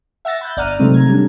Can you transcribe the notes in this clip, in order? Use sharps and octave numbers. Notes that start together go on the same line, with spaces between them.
E5 F#5 E6 A6 A#6
B5 F#6 G6
G1 D5 F#5 A#5 F6 D#7
C3 D#3 F#3 G#3 A3 C4
A#5 G#6
G3 C#4 D4